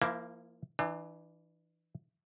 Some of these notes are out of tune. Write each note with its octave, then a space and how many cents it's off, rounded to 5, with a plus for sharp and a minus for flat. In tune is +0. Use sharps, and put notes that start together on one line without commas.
F3 -30 A#3 +0 E4 +0
E3 +0 D4 +40